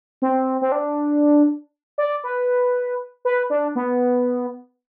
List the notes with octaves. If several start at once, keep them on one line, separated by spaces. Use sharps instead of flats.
C4
C4
D4
D5
B4
B4
D4
B3